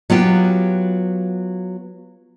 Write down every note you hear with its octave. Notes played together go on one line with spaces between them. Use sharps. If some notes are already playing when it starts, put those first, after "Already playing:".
F#3 B3 F4 G4